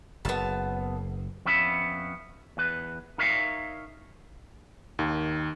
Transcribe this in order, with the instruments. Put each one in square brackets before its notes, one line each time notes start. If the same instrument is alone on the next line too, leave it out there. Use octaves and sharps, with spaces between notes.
[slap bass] F#1 [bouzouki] B3 A5
[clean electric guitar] F2 B3 C#4 E5 B5
E2 B4
D#4 A#4 C#5 E5 F5
[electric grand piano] D#2 D#3